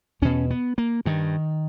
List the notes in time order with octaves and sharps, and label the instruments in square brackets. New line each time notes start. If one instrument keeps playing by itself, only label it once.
[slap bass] E2 B2 C#4
B3
A#3
G2 D#3